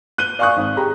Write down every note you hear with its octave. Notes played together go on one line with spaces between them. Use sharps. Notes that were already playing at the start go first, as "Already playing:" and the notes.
F#6 D#7 G7
D5 F5 G#5 C#6 D#6 F#6
G#1
G4 G#4 A#5